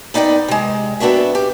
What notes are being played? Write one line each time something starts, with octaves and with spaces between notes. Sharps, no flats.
B3 D#4 D5 F5 G5
C3 G#3
B3 C4 D4 F#4 E5
G4